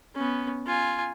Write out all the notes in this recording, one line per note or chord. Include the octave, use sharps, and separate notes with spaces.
B3 C#4
F4 G#5